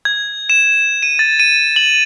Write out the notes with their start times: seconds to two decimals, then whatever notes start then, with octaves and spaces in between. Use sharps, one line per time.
0.05 G#6
0.50 E7
1.03 D#7
1.19 A6
1.40 D#7
1.76 F#7